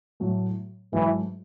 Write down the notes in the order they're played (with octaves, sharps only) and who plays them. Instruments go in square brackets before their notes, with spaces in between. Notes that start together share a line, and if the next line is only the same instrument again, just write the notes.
[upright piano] A2 F#3 A3
[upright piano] G#2 F#3 A3 [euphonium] E3